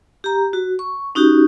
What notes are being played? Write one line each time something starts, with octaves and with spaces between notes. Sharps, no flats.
G4 A#5
F#4
C#6
C#4 D#4 F#4 G4